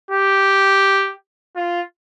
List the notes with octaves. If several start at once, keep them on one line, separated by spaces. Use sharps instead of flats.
G4
F4